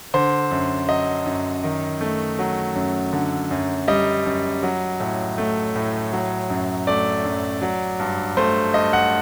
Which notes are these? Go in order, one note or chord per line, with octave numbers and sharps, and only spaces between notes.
D3 C5
F#2
F#3 D#5
F#2
D#3
A3
F#3
F#2
D3
F#2
G3 D#5
F#2
F#3
A2
A3
A2
F#3
F#2
A3 D5
F#2
F#3
G2
A3 C5
G2 D#5
F#5